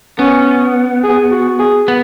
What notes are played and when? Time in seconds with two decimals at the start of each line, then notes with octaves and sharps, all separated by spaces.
0.19 B3 C#4
1.04 G#4
1.31 F#4
1.59 G#4
1.88 B3